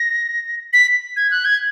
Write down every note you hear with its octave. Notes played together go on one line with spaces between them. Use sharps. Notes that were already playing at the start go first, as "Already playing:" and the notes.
Already playing: A#6
B6
G#6
F#6
G#6